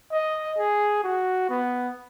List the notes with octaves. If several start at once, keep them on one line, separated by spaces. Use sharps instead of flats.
D#5
G#4
F#4
B3